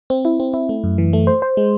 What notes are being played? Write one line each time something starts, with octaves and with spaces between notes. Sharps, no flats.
C4
E4
C4
E4
A3
F#2
E3
A3
C5
C5
G#3